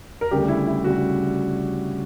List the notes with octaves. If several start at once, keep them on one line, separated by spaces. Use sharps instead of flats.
A#4
D2 C#3 G3 G4
E4
E4
C#3 G3 F#4